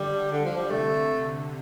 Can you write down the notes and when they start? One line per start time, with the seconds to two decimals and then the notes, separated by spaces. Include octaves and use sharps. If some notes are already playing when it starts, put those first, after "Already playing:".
Already playing: D3 G3
0.32 D3
0.45 F3
0.57 G3
0.70 C3 A3